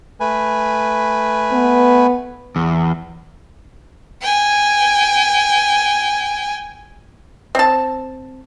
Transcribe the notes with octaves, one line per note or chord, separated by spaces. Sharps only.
A3 B4 G#5
B3
E2
G5 G#5
C4 A5